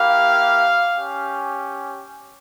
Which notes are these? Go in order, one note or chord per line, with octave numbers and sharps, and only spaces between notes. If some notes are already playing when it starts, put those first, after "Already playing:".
Already playing: A#3 E4 G4 F5
C#4 G4